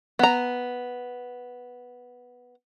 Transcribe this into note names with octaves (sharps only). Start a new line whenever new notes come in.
B3 A#5